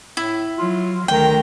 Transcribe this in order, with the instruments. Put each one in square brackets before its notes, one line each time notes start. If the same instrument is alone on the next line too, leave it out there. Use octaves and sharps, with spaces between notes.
[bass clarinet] A2 [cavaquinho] E4
[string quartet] F#3 [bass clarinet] F4
[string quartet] D2 A#5 [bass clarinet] D#3 [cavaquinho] G5